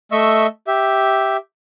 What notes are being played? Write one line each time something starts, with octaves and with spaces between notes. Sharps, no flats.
A3 D#5 E5 C#6 E6
G4 E5